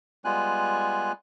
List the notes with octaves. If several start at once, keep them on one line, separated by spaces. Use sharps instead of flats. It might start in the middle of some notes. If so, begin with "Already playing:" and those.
G3 G#3 B3 F4 G#5 F#6